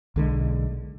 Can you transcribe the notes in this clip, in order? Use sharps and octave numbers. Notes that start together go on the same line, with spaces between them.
B1 D3 E3 G#3